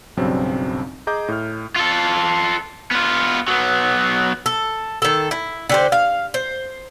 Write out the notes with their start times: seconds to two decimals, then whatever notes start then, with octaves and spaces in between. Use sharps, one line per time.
0.17 B1 G2 C#3 F#3 C4 D4
1.07 G#4 D#5 A#5 D6 G6
1.28 A2 F6
1.77 F4 A4
2.92 B3 F4
3.48 F#3 B3
4.46 A4
5.02 D#3 A4
5.31 E4
5.69 D3 G4 C5
5.92 F5
6.34 C5